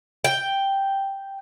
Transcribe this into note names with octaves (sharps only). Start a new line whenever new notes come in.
G5